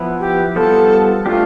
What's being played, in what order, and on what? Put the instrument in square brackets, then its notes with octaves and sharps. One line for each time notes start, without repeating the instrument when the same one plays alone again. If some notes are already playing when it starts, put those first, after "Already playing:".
Already playing: [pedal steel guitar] F3 B3 E4 B4
[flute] G4
[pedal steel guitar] G3 B3 F4 C5 [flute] A4
[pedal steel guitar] A3 D4 G4 [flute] F4